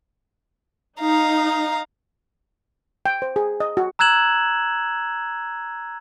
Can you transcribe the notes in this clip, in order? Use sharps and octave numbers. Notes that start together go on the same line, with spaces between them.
D#4 F5 A#5
G5
C5
G#4
D#5
F#4
A#5 E6 F#6 G#6 E7 F#7